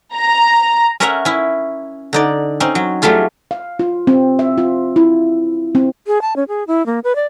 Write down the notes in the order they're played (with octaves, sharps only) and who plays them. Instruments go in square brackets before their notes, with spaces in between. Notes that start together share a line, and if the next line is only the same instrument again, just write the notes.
[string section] A#5
[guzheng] C#4 A#4 C#5 E5 F#5 A#5
C#4 E4
D3 D#4 D5
C4 C#4 D#4
F#3
F#3 G3 A3 F4 G#4
[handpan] F5
F4
C4
E5
F4
E4
C4
[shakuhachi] G#4
A5
C#4
G#4
E4
A#3
B4
D5